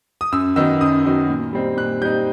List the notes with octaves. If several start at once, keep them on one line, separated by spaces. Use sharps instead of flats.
D#6
F#2 E6
D#3 F#3 B3 D#4 E6
F#2 D#6
D#3 F#3 B3 D#4
A#2
G3 C4 D#4
A#2 F#6
G3 C4 D#4 G6